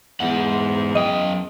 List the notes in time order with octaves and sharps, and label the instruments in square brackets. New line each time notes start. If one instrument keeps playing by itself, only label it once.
[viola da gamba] E2 [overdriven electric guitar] G#2 F#5
[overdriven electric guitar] F#2 G5 [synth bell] D#5